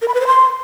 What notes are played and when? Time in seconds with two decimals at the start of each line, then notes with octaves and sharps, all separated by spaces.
0.02 A#4
0.08 B5
0.14 B4
0.21 C5
0.27 C6